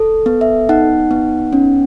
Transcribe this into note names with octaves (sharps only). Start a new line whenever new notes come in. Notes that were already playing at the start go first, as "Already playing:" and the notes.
Already playing: A4
B3
E5
D#4 F#5
B3
C#4